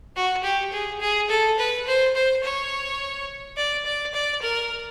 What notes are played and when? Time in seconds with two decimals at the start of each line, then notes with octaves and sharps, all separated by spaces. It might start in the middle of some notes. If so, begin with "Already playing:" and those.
0.16 F#4
0.43 G4
0.72 G#4
1.00 G#4
1.29 A4
1.58 B4
1.87 C5
2.15 C5
2.43 C#5
3.56 D5
3.85 D5
4.14 D5
4.42 A#4